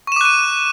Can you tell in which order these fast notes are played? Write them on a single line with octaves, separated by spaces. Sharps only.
C#6 E7 D6 F#6 D#7